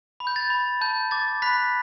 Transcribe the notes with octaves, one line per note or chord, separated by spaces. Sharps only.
B5
G6
A6
B5
A5 G6
D6 A6
B5 F#6 B6